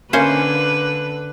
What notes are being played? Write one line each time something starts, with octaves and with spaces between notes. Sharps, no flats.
D3 A#3 C#4 B4 C5